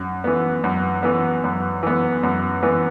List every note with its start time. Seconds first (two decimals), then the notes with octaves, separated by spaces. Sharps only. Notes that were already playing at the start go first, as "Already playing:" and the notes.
Already playing: F#2
0.24 E3 B3
0.64 F#2
1.03 E3 B3
1.44 F#2
1.83 E3 B3
2.23 F#2
2.63 E3 B3